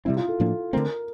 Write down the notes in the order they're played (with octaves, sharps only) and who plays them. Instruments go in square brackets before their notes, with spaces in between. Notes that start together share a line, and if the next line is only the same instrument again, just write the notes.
[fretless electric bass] C3 G3 C4 [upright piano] E4
[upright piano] F4
A4
[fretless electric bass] A2 F3 A#3 D4
[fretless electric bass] D3 A3 C4 [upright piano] A#4